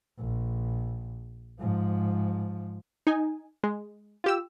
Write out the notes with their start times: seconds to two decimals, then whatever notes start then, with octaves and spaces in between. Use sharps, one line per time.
0.19 A#1
1.60 G#2 F3
3.07 D#4 G#5
3.63 G#3
4.24 F4 G4 E6